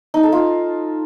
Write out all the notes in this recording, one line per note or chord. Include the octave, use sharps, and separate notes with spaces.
D#4
A4
F4